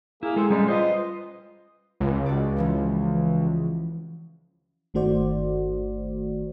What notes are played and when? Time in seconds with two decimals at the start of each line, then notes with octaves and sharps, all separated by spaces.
0.23 A#3 E4 G#4
0.36 G#3 C4 A4
0.50 G3 G#3 C#4 D#4 D5
0.68 F4 B4 C5 D#5
2.01 C#2
2.26 F#4 D5
2.57 E3 F3 C#4
4.94 G1 D#3 A3 F#4 C5 D5